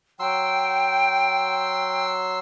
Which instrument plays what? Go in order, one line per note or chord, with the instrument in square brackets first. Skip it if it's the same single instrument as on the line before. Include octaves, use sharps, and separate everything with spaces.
[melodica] F#3 C6 E6 [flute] G5